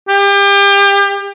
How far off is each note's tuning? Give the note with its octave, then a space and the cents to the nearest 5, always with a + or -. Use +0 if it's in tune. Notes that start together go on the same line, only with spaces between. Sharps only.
G4 +30